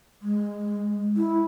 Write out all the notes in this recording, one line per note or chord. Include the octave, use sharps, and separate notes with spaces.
G#3
E4